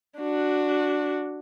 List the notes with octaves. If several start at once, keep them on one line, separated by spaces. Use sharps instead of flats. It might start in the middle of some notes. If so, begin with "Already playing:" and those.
D4 F#4